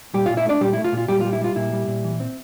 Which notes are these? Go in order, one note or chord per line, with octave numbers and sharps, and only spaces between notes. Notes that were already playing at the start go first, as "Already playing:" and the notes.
A#2 G3 G4
A#2 F4 F5
E4 E5
A3 D4 D5
A#2 G3 G4
A3 E4
F4
A#2
F4
A#2 G3 G4
G3 F4
E4
G3 F4
A#2 E4
G3
A#2
E3
C4